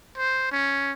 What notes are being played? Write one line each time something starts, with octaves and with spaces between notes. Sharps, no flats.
C5
C#4